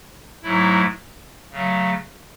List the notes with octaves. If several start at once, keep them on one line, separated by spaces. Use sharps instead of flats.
G#2 F#3 A3 E4
C#3 F#3 A3